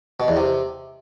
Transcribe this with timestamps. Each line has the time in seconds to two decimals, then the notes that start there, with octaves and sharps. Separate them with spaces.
0.20 B2
0.28 E2
0.37 C3